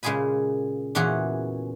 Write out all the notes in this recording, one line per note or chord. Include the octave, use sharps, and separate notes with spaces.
A#2 C#3 G#3 G#4 G#5 B5
E2 A#2 E3 C#4 F#4 G#4